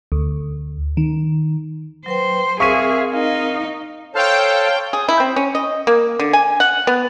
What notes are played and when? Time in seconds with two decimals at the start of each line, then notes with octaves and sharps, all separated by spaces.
0.12 D2
0.97 D#3
2.06 F#3 B4 C5 G5
2.60 C4 G#4 A#4 E5 F5 C#6 B6 D#7
3.13 D#4 F5
4.15 A4 C5 C#5 F5 G5 A5
4.93 G#4
5.08 E4
5.20 C4
5.36 C#4
5.55 D#5
5.87 A#3
6.19 D3
6.33 G#5
6.60 F#5
6.87 B3